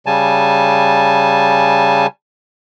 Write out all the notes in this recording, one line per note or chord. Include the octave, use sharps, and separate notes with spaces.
C#3 G3 G#5 A5